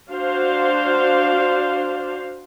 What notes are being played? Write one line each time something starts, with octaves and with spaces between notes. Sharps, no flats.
D4 F#4 C5 F5